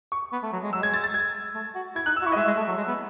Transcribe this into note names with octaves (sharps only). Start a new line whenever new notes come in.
C#6
B3
A3
F#3
G#3
F#3 E6
G#3 G#6
A6
A6
G#6
A3
F#4
E4 G#6
D#4 F#6
E6
F#4
E4 C#6
D#5
G#3 E5
G#3
A3
F#3
G#3
B3